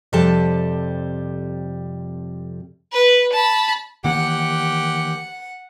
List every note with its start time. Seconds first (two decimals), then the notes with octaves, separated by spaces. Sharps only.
0.13 F2 C3 G3 G4 A4 A5
2.92 B4
3.32 A5 B5
4.04 D#3 E3 A#3 G4 F#5